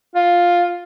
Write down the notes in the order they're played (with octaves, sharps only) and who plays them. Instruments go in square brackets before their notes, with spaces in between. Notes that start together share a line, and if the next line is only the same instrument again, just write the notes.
[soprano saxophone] F4